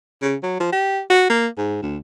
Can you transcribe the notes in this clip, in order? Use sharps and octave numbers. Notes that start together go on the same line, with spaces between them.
C#3
F#3
F3
G4
F#4
A#3
G#2
D2